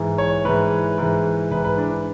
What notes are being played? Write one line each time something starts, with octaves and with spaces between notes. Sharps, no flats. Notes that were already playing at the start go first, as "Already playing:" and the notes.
Already playing: G#2 E3
C#5
G#2 E3 B4
G#2 E3
G#2 E3 B4
B4
D4